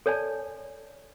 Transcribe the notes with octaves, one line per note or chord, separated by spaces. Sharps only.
A4 C#5 D5 G#5 A5